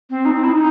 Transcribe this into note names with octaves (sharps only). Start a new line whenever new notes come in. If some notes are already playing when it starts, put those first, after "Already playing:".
C4
D#4
C4
E4
D#4